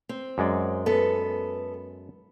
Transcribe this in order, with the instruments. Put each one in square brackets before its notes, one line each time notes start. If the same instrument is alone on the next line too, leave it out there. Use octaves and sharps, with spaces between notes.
[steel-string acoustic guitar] C4
[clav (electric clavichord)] F#2 G#3 D5
[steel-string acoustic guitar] B3 A4 B4